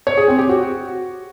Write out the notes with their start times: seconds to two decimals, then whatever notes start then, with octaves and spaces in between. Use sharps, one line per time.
0.07 C#5
0.17 G#4
0.28 C4
0.39 G4
0.49 F#4